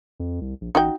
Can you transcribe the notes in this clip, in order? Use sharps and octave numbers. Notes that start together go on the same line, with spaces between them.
F2
C2
A#1
A1 D#4 F#4 G5